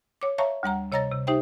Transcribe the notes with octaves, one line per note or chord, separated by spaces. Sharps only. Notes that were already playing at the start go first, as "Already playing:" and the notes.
C#5 D6
C#5 E5 F5 A5 A#5 C#6
D2 G3 F#5 A#5
C3 C#5 D#5 A#5 A6 A#6
C3
D#4 G4 C5 E5 G5